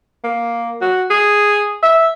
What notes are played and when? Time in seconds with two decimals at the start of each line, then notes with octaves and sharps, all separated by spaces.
0.24 A#3
0.81 F#4
1.10 G#4
1.83 E5